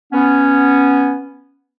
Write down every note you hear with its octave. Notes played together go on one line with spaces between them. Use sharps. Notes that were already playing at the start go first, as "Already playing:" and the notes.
B3 C#4